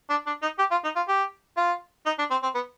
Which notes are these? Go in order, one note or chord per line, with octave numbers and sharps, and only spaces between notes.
D4
D4
D#4
G4
F4
D#4
F4
G4
F4
D#4
D4
C4
C4
B3